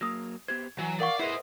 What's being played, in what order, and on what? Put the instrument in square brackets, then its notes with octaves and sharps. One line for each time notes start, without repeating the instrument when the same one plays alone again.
[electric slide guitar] F#3 A#3 [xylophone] D#6 E6 A#6
[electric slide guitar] B3 G4 C5 [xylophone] G#6
[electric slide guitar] E3 [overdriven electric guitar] F#3 [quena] G#5
[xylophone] A#4 F#5 C#6 [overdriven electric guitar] D5 [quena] F5
[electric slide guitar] E4 G#4 B4 [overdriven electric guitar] C5 D#5 [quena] E5